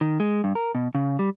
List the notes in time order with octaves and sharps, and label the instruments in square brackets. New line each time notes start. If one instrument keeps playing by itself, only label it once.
[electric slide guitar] D#3
G#3
G2
A#4
B2
C#3
G3